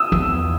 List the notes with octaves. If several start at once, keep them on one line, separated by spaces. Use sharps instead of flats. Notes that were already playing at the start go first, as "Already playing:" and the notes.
Already playing: D#6 E6
E2